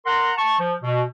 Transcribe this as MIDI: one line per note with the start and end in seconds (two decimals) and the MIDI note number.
0.06 0.33 70
0.06 0.33 78
0.06 0.33 82
0.06 0.33 84
0.37 0.59 81
0.37 0.59 85
0.59 0.74 53
0.83 1.02 47